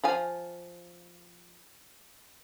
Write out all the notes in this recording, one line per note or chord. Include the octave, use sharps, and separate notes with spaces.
F3 F5 G#5